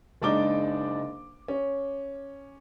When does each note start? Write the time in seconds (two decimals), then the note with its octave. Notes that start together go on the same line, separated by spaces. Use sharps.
0.22 F#1 G#3 D4 D#4 D6 G7
1.48 C#4